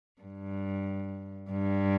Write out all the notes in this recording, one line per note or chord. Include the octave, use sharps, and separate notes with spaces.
G2
G2